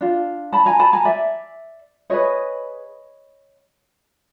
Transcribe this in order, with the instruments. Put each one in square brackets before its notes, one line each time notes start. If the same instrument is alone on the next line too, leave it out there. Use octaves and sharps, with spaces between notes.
[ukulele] D4 F4
A5 B5
G#5 A#5
A5 B5
G#5 A#5
D5 E5
E4 G#4 B4 C#5 D#5